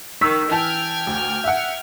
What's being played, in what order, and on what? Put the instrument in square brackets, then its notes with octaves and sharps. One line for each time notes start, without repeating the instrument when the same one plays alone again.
[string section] D#3 [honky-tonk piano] C#6 E6 B6
[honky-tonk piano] E3 A5 [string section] G5 F6 G#6
[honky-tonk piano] D2
E5 F#5